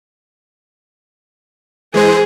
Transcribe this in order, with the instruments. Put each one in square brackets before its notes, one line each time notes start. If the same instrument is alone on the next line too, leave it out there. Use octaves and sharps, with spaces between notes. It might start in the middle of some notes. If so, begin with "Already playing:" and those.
[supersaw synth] E3 G#3 C5 [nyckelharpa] G#4